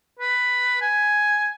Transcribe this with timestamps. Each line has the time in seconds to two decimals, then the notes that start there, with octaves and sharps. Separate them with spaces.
0.20 B4
0.81 G#5